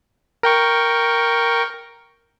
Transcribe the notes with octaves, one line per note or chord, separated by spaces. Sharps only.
A#4 G5 C#6